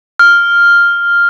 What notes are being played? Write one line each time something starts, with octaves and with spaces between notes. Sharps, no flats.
F6